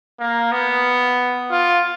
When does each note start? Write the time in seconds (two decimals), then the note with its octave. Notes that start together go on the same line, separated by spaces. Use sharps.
0.20 A#3
0.52 B3
1.51 F4